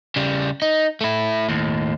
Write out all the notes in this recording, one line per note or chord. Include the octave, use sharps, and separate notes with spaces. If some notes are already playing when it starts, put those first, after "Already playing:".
C#3 G3
D#4
A3 E4
D#2 A2